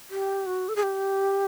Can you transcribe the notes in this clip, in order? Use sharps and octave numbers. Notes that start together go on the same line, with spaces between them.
G4
F#4
A4
G#4
G4